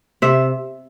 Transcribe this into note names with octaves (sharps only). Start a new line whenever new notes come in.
C3 E5